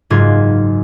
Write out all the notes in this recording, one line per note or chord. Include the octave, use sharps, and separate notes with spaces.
F#1 G#2 F4 G#6